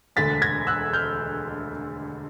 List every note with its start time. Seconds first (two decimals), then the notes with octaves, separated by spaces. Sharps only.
0.16 E1 D2 D3 A6 B6
0.42 G#6 A#6
0.67 E6 F#6
0.93 F6 G6